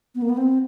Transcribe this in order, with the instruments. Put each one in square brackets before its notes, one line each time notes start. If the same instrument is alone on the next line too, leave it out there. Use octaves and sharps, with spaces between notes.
[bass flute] B3
A#3
B3
C4